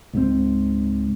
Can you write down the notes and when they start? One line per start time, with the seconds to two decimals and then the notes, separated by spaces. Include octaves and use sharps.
0.13 C#2 G#2 F3 C4